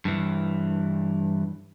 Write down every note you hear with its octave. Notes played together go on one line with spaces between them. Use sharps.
G2 E3